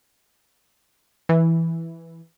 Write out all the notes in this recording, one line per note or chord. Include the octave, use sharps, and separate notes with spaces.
E3